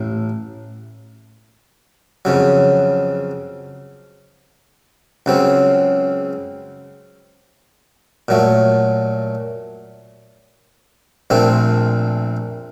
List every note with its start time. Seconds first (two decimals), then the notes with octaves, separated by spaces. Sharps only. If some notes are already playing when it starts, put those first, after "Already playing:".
Already playing: A1 A2
2.25 F2 C#3 F#3
5.26 C#2 C#3 F#3 C4
8.28 A#2 F#3 A3
11.30 A#1 A#2 A3 C4 F4